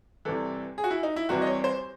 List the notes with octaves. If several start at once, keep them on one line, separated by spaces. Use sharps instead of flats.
C2 C3 E3 A4
G#4
F#4
E4
D#4
E4
C2 C3 E3 F#4
D#5
C#5
C5